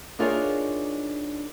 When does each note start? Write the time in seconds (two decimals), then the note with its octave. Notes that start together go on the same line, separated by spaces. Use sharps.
0.19 D4 D#4 F4 G#4 A#4 C#5